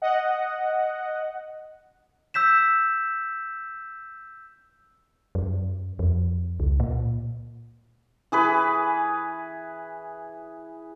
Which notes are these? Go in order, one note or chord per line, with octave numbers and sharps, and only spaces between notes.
D#5 F#5
E6 G6 B6 E7
F#2
F2
C#2
A#2
E3 G#4 B4